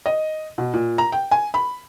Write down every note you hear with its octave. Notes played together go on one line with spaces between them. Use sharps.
D#5
B2
A#2
A#5
G5
G#5
B5